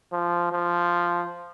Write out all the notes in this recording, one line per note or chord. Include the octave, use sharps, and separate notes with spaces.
F3
F3